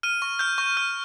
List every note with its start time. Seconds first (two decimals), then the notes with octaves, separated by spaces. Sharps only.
0.03 F6 D#7
0.22 C#6
0.39 F6 G6
0.58 C#6 G6
0.77 F6